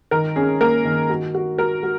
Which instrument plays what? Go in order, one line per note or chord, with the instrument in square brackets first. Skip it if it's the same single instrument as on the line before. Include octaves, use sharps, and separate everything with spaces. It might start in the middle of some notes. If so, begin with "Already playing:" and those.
[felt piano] D#3 [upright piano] A#4
[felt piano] C#4 [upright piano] G#4
[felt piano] A#3 [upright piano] A#4
[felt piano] D#3
F#4
F#4
[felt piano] F#4 [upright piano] A#4
[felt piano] F#4